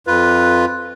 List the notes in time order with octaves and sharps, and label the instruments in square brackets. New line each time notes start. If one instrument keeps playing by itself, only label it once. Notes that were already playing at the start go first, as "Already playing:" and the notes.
[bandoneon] F2 F4 B4